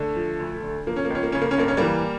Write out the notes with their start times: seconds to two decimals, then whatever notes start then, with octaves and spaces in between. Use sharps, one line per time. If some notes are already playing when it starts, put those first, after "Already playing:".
Already playing: D3 A3
0.16 F3
0.40 D2
0.63 D3
0.87 F3 A#3
0.96 C#4
1.05 A#3
1.10 C#2 C#4
1.23 A#3
1.32 C#3 C#4
1.42 A#3
1.51 C#4
1.58 G2 A#3
1.68 C#4
1.77 E3 G3 A#3